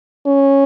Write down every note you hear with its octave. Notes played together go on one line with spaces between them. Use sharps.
C#4